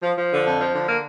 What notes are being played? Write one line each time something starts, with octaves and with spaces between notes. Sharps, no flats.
F3
F3
D3
F2
F3
D3
A#3